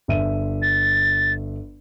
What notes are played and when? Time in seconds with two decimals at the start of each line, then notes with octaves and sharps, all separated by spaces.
0.08 G1 E5 D#7
0.62 A6